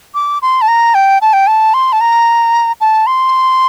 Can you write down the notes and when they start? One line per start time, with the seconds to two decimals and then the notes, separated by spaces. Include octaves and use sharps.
0.15 D6
0.42 C6
0.61 A5
0.68 A#5
0.94 G5
1.21 A5
1.33 G5
1.47 A5
1.74 C6
1.92 A5
2.01 A#5
2.81 A5
3.07 C6